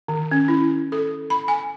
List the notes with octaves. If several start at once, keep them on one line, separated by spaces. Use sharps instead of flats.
D#3
C#4
E4
A4
B5
G#5